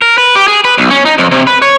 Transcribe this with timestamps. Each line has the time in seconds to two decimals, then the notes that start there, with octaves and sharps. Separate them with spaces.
0.02 A#4
0.18 B4
0.36 G4
0.48 G#4
0.65 B4
0.78 B1
0.91 C#4
1.05 D#4
1.18 F2
1.31 C3
1.47 B4
1.62 C#5